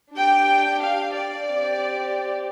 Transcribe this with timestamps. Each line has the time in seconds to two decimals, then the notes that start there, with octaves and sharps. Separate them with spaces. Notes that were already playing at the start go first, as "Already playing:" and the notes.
0.15 D4 G4 G5
0.81 F5
1.14 D5
1.47 C4 G4